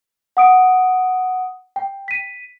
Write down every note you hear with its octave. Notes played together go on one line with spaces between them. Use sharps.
F#5 D#6 D7
G5
B6 D#7